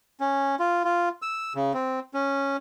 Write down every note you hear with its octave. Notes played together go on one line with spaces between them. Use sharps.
C#4
F4
F4
E6
C#3
C4
C#4